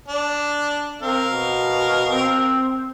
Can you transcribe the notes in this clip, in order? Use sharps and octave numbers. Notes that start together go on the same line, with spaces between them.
D4
C4 A#4 F5
B2
C4